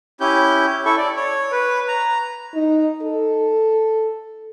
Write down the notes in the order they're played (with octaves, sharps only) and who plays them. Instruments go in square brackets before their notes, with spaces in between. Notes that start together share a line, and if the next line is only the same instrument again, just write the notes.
[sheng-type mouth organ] C#4 E4 G4 G6
E4 A4 C#6
D5
C#5
B4
A#5
[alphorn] D#4
A4